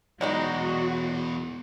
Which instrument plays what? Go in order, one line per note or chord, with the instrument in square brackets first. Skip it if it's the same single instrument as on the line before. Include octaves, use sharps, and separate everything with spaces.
[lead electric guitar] B2 E3 [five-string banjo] F#3 G#3 D#4 [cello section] F#4 [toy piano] D5